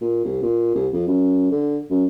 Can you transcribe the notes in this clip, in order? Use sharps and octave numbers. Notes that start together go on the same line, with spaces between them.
A#2
C2
A#2
C2
F2
F#2
D3
F#2